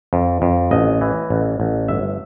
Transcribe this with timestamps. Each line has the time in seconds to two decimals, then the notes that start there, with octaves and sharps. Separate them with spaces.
0.13 F2
0.42 F2
0.71 A1 D#5
1.01 E3
1.30 A1
1.60 A1
1.88 G1 E5